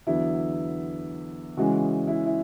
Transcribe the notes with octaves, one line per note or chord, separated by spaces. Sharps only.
E2 D3 F#3 B3 E4
C#3 E3 G#3 C#4 F#4
E4
E4